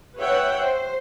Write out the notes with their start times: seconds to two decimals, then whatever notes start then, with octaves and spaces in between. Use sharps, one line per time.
0.18 B4 C#5 E5 F#5 G5
0.63 C5